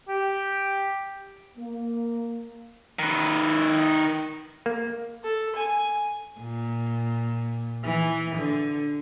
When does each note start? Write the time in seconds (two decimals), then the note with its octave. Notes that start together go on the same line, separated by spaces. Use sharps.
0.09 G4
1.56 A#3
2.99 D#3 B4
4.66 A#3
5.23 A4
5.55 G#5
6.41 A#2
7.85 E3
8.37 D3